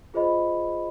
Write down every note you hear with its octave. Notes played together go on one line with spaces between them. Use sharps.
F4 G#4 C5 D#5 B5